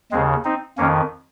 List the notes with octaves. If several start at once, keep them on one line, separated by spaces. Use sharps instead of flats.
D#2 C#3 G#3 C4
C4 D#4
F2 D#3 A#3 C#4